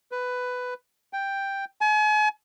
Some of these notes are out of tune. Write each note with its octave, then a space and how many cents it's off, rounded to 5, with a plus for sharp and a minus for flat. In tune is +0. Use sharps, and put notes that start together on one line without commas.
B4 +10
G5 +5
G#5 +40